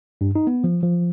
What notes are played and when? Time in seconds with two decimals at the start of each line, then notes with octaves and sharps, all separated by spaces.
0.21 G2
0.35 D#4
0.47 B3
0.64 F3
0.83 F3